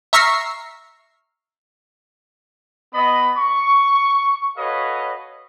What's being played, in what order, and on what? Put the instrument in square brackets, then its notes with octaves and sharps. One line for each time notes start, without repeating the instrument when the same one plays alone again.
[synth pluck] E5 A#5 C#6 E6 F6 C7
[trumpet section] B3 D#5 B5
C#6
F#4 A4 B4 C#5 D#5 F5